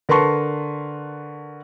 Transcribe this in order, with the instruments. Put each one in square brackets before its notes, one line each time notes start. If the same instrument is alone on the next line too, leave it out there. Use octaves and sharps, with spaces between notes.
[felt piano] D3 A#4 B4 A5 C6 C#6